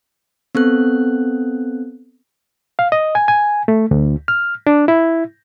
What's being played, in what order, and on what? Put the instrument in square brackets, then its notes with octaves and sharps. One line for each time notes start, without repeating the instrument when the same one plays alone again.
[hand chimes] B3 C4 A4 F#6
[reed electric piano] F5
D#5
G#5
G#5
A3
D2
F6
D4
E4